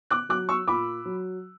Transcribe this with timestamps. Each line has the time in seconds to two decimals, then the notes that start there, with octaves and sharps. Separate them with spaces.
0.10 D6 F#6
0.29 F#3 D6 F#6
0.49 C#6 E6
0.67 A#2 B5 D6
1.05 F#3